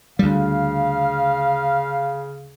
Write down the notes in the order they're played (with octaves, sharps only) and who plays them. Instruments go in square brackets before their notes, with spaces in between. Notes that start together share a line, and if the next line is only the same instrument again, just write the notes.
[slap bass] D2 G3 [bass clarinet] C#3 [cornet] F5